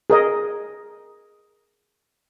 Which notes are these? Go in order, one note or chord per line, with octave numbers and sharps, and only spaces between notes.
G#4 A#4 D#5